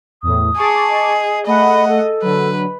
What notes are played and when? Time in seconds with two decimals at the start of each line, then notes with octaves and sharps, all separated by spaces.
0.23 E2 A2 D#6
0.57 G#4 A5 C#6 D6
0.89 D#5
1.47 A3 D#5 F#5 B5
1.88 A4
2.22 D3 F#3 B4